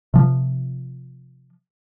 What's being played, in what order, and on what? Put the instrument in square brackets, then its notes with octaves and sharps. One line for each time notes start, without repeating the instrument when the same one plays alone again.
[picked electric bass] C3 F3